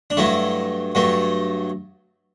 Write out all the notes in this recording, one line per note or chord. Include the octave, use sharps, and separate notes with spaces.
D4
G2 F#3 A3 E4
G2 F#3 A3